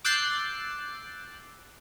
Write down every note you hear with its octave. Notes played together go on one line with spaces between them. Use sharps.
D6 E6 F#6 G6 A6 C7